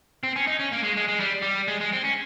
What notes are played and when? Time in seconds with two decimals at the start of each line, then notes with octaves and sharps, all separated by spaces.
0.23 C4
0.36 C#4
0.47 D#4
0.59 C#4
0.72 A#3
0.83 G#3
0.96 G#3
1.08 G#3
1.20 G3
1.42 G3
1.67 G#3
1.80 G#3
1.92 C4
2.04 C#4